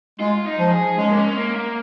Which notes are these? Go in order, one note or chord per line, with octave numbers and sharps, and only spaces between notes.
G#3 F4
D#4
F3
G#4
G#3 C#4
A#3
C#4
A#3
A#3